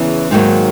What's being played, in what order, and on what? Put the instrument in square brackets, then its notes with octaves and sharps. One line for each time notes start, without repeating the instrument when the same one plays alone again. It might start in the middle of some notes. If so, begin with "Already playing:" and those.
Already playing: [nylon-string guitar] E2 C#3 E3
G#2 D#3 F#3 A#3